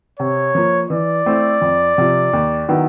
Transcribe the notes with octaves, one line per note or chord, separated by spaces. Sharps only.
C3 C#5
F3 A#3
E3 D5
A3 C4 E4
F2
C3 F3
D#2
D#3 F#3 B3 E4